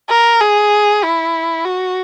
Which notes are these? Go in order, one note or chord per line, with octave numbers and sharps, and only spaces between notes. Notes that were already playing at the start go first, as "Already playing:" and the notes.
A#4
G#4
E4
F#4